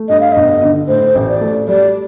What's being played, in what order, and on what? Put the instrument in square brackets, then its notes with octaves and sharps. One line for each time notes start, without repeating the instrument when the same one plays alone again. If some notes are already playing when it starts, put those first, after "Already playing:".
Already playing: [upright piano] A3
[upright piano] G2 [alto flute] D#5
[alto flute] F5
[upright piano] G1 [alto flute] D#5
[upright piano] D3
[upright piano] A2 [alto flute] C5
[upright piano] A1
[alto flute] D5
[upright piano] A3
[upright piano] G3 [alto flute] D5